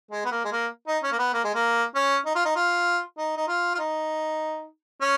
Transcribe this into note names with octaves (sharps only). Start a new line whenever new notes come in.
G#3
B3
A#3
G#3
A#3
D#4
C#4
A#3
B3
A#3
G#3
A#3
C#4
D#4
F4
D#4
F4
D#4
D#4
F4
F4
D#4
C#4